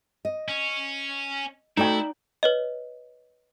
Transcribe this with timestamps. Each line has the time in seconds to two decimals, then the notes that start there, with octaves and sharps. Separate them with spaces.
0.25 D#5
0.48 C#4
1.77 A3 D#4 E4 F#4 A4 D5 G5
2.43 B4 C#5 D#5